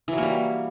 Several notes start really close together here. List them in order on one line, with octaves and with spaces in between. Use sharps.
E3 F#3 A#3 G3